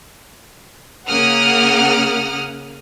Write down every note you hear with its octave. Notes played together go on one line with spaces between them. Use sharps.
C#3 A#3 A#4 F#5 D#6 F6